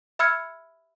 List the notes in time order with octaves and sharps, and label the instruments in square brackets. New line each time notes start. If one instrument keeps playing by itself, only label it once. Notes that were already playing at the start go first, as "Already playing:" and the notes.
[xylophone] E5 B5 E6 F6 G#6 C#7